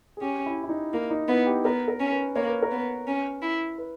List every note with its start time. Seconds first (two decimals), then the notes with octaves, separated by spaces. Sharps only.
0.17 G#4
0.21 C#4 G4
0.46 E4
0.64 E4
0.69 D#4
0.93 A#3 D#4
1.10 D#4
1.28 B3 E4
1.46 G4
1.65 B3 A#4
1.88 A#4
2.00 C#4
2.12 B4
2.36 A#3 C#5
2.48 B4
2.63 A#4
2.71 B3 B4
3.07 C#4
3.42 E4
3.78 B4